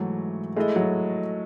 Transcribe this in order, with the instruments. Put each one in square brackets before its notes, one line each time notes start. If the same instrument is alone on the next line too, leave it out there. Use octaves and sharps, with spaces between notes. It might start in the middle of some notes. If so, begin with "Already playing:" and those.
Already playing: [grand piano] G#2 E3 A3 [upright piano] F#3
[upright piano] G#3 [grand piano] A3 E4 A4 D#5
[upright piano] F#3